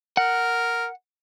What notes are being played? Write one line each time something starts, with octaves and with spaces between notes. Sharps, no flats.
A#4 F#5